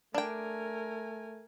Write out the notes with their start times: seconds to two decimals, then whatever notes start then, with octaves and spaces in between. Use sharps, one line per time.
0.14 A3 D4 A#4 G5 G#5